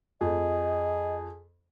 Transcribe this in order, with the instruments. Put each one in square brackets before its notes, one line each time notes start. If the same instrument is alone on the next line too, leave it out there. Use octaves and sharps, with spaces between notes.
[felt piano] F2 [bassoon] G#4 [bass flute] D#5